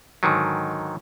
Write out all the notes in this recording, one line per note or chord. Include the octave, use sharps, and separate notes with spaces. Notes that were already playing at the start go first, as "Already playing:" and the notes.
G#2 D3 D#3 F#3